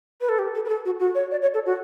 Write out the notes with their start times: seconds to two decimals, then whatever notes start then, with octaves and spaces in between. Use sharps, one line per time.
0.21 B4
0.29 A4
0.39 G4
0.55 A4
0.65 B4
0.69 A4
0.85 F#4
0.99 F#4
1.15 C#5
1.31 D5
1.42 C#5
1.54 A4
1.66 F#4